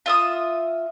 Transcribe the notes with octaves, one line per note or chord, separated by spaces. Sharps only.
F4 E5 D#6